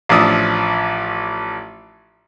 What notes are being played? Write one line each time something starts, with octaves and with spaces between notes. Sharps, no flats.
A1 F3 D4 E5 D#6